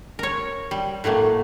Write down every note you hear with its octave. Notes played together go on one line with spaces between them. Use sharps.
A#4 C#5
G3
A2 F#3 A3 A#3